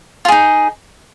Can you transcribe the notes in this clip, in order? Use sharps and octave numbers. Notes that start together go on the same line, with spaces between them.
D#4 F4 G#4